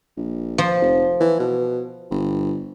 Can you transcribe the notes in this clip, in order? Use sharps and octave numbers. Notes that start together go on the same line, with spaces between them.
A#1
F3
F1
E3
B2
G1